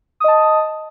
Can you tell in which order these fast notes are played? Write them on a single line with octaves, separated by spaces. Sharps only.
D#6 D#5 A5